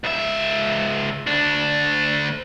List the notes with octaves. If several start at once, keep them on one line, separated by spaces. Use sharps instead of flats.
C#2 E5
D2 D4